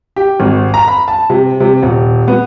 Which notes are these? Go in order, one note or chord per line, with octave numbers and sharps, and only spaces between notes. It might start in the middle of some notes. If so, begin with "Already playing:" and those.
G4
G#1
A#5
B5
A5
C3
C3
D#1
B3